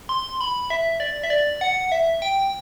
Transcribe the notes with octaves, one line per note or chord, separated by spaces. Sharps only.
C6
B5
E5
D5
E5
D5
F#5
E5
G5